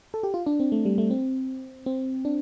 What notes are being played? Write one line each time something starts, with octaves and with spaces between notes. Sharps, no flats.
A4
G4
F4
D4
C4
A3
G3
A3
C4
C4
D4